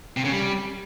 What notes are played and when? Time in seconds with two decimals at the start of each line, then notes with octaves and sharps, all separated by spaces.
0.17 C3
0.24 C#3
0.32 G3